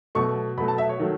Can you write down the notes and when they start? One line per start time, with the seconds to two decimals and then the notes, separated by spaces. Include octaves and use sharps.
0.15 B2 F#3 A3 C#6
0.57 B2 F#3 A3 B5
0.68 A5
0.78 E5
0.89 C#5
0.99 D#3 F#3 A3